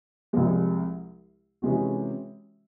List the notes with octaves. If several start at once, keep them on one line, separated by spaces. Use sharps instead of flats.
C2 C3 F3 G#3
C3 E3 G#3 C#4 F#4